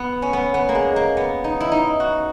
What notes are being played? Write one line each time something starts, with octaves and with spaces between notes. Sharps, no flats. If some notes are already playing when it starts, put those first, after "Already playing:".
Already playing: B3
C#4
B3
B3
A#3
G#3
A#3
B3
D#4
E4
D#4
F#4